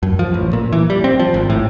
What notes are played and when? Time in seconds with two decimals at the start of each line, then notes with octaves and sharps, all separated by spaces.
0.03 F#2
0.19 F3
0.34 A1
0.53 A#2
0.73 E3
0.90 G3
1.04 C4
1.20 F3
1.34 G#1
1.50 A2